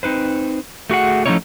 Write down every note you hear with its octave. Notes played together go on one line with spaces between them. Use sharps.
C4 D#4 B4 C5
A3 F#4 G#4 F#5
F3 A3 C#4 D#4 E4 C#5